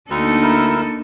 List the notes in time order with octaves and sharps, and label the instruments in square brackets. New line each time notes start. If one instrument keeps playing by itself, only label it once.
[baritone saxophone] D2 [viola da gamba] A#3 D4 [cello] D#4 A4
[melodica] E4 A#4 E6